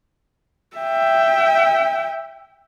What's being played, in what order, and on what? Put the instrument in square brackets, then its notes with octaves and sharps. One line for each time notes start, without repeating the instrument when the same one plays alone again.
[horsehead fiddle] E5 G5